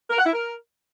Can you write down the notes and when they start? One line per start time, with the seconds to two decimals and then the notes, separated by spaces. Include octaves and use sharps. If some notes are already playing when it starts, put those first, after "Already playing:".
0.10 A#4
0.18 F#5
0.26 E4
0.33 A#4